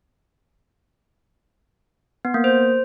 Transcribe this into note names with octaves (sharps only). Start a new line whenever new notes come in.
B3
A#3
C5